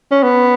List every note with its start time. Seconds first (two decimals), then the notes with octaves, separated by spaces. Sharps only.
0.11 C#4
0.23 B3